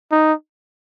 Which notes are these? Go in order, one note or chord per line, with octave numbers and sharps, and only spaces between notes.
D#4